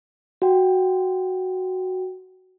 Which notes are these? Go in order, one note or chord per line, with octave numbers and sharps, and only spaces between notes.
F#4 G5